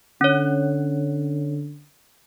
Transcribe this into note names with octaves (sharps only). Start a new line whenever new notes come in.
D3 C#4 C#5